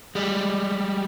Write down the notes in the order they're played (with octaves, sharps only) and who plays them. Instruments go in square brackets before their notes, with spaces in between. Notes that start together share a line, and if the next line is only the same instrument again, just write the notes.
[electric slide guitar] G3 G#3